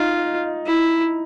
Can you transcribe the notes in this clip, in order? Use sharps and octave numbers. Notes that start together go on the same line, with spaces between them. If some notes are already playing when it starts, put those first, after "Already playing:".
Already playing: D#4 F4
E4